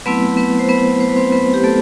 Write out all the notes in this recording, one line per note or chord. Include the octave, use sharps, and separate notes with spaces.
F#3 A3 B3 C4 E4 B4
B3 B4
C5
B3 B4
C5
B4
C4 C5
B3 B4
G4
A3 A4